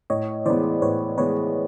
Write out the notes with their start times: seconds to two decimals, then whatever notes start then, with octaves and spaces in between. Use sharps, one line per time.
0.10 A2 C#5 D#5
0.46 E3 G#3 B3 C5 D5
0.82 A2 B4 C#5
1.18 E3 G#3 B3 B4 C#5